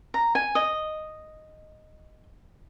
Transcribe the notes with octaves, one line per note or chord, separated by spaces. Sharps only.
A#5
G#5
D#5